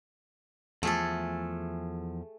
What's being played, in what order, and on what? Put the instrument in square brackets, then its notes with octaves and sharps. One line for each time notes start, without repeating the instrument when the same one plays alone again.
[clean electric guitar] E2 F3 [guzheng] A3 G#4 A4